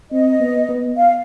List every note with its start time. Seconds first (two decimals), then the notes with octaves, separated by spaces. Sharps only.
0.11 C4 D#5
0.40 B3
0.69 B3
0.97 F5